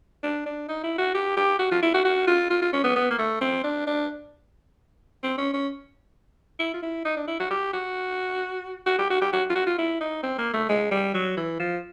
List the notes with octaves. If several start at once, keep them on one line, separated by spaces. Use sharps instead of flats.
D4
D4
D#4
E4
F#4
G4
G4
F#4
F4
E4
F#4
F#4
F4
F4
F4
C#4
B3
B3
A#3
A3
C4
D4
D4
C4
C#4
C#4
E4
F4
E4
D#4
D4
E4
F#4
G4
F#4
F#4
G4
F#4
G4
F#4
F4
F#4
F4
E4
D#4
C4
A#3
A3
G#3
G3
F#3
E3
F3